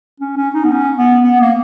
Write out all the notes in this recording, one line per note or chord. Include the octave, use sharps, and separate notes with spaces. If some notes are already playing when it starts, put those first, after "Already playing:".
C#4
C#4
D#4
B3
C#4
B3
B3
A#3